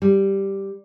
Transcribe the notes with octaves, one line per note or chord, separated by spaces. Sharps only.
G3